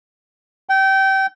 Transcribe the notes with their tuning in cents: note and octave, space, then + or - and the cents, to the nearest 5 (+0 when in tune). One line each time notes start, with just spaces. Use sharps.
G5 -25